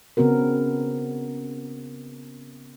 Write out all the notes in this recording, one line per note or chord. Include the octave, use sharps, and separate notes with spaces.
C#3 B3 C4 F#4 A#4